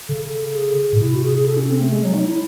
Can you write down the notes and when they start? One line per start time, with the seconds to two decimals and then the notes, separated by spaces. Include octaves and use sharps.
0.09 C#3 A4
0.28 A4
0.45 A4
0.55 G#4
0.93 A2
1.00 C3 E4
1.15 F#4
1.24 G#4
1.35 G#4
1.46 A4
1.57 C#4
1.69 C4
1.81 A3
1.92 G#3
2.03 F#3
2.14 D#4
2.26 E4